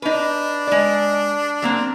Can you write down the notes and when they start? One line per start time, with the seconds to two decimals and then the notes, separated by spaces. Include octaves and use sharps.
0.02 D4 D#4 B4
0.67 G#3 D5
1.62 F#3 A#3 C4